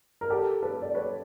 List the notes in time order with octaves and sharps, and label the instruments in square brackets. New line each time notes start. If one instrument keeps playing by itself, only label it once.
[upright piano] A#4
G4 A4
A4 B4
D5
B4 C#5